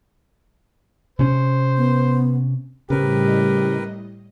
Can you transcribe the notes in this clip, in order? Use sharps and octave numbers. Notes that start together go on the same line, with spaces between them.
C3 C#4 C5
B3
A2 C#3 G3 C4 G4 A#4 B4 D#5